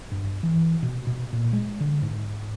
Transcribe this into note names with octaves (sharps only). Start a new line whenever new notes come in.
G2
E3
B2
B2
A#2
G#3
D3
G#2